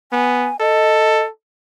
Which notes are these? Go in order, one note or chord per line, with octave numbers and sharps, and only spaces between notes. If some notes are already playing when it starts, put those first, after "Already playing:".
B3 G#5
A4 D#5